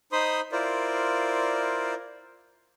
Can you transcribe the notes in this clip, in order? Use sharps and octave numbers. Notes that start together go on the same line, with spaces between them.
D#4 C5 B5 C6 D#6
E4 F4 A#4 C5 D5